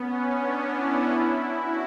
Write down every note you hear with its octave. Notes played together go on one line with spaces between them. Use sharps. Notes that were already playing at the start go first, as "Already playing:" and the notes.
Already playing: B3 C#4
D4
E4
E4
F#4